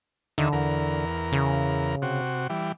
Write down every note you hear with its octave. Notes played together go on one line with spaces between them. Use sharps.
D#2 D3 D#3 E5
E2 A#4
C#3
C3 F#4
E3 G3